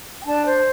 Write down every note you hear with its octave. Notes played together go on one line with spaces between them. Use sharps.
G5
D4 A5
C5